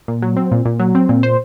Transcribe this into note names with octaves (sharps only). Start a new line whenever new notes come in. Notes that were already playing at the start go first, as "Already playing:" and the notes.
A#2
F#3
C4
A#2
A#2
F#3
C4
A#2
C5